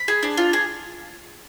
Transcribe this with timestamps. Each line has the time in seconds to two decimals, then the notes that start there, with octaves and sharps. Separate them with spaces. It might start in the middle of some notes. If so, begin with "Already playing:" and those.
Already playing: B5
0.08 G#4
0.23 D4
0.37 F4
0.53 G#4